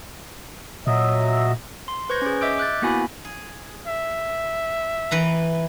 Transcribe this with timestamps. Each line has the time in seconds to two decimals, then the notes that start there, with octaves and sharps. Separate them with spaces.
0.87 A#2 F#3 D#5 E5
1.88 C6
2.10 B4 C5 C#6 G6 G#6 A#6
2.22 C#4 G#4
2.41 D#5 E5 D6 E6 G6 D7
2.58 D6 F#6 G6 A6
2.82 A#3 B3 E4 F#4 G#5 B5
3.25 G#4
3.87 E5
5.11 E3 B4 A#5